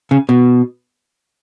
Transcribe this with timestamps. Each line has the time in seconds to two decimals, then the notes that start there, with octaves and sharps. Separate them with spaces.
0.11 C#3
0.29 B2